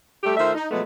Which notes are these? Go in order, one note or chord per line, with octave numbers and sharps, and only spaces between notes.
G3 A3 G4
D#3 A3 F4 C5 E5
D#4
B2 F3 F#3 G#3 A3 B3